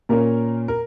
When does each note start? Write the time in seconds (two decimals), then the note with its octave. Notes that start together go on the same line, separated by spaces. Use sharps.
0.09 A#2 A#3 C#4 A#4
0.68 A#4